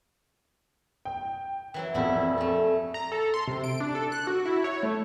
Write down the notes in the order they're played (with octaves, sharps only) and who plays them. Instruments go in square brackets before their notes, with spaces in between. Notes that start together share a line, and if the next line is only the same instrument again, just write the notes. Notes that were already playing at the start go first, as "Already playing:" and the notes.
[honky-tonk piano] G5
[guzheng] E3 F#3 E4
[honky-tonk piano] A#1 F2 [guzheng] D4 E4 G4
[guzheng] A3 A4
[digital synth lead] A#5
A4
C6
C3
D7
D4
A4
F#6
F#4
E4
C#5
A3